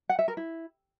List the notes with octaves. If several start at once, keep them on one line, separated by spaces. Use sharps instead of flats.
F#5
E5
A#4
E4